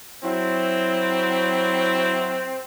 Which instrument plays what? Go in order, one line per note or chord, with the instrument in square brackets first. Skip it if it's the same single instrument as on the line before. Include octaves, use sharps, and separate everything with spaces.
[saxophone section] F#3 E4 [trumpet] C4